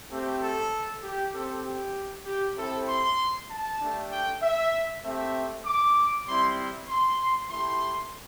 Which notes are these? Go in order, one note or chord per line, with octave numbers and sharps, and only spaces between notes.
A3 C4 G4
A4
G4
C4 G4 A4
G4
G4
C4 E4 G4 A4
C6
A5
A3 D4 G4
G5
E5
A3 C4 G4 E5
D6
G3 C4 E4 C6
C6
A3 E4 G4 C6